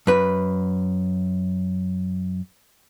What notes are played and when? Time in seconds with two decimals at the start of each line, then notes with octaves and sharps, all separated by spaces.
0.07 F#2 B4